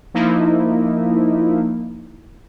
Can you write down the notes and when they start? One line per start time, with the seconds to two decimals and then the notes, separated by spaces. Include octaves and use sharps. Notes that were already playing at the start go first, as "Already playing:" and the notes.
0.14 F3 A#3 D#4 E4